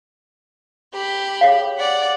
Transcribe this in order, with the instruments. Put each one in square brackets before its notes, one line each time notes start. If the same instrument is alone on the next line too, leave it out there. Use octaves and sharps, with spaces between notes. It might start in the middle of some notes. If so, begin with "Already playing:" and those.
[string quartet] G4 B5
[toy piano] G#4 C#5 F5
[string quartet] D5 F#5